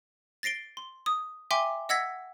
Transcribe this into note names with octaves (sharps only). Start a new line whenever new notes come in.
A6 A#6 C7 D7 G7
C6
D#6
E5 G5 G#5 C6 D6
D#5 F#5 E6 G#6 A#6 B6